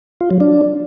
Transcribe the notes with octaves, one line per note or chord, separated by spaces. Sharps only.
F4
F#3
D4